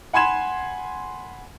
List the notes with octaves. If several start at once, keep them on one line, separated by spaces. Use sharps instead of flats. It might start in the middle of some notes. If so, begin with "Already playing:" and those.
F#5 G#5 B5 C6 G#6 E7